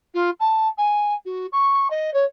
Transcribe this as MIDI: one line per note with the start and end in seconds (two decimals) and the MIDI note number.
0.14 0.30 65
0.40 0.67 81
0.77 1.14 80
1.25 1.46 66
1.52 1.88 85
1.90 2.13 75
2.13 2.25 73